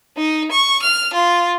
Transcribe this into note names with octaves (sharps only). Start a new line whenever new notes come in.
D#4
C#6
F6
F4